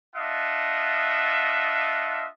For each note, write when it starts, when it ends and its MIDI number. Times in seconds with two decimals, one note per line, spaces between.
0.16 2.24 62
0.16 2.24 65
0.16 2.24 75
0.16 2.24 76
0.16 2.24 78